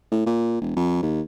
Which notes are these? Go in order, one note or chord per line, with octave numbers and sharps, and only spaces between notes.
A2
A#2
E1
F2
D#2